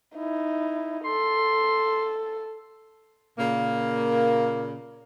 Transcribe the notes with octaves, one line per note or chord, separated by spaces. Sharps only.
D#4 E4
A4 C6
A#2 C#3 A#3